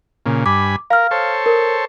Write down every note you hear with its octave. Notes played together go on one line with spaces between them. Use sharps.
A#2 C#3
G2 G#5 B5 D6
A#4 F5 F6
A4 C5 C#5
A#4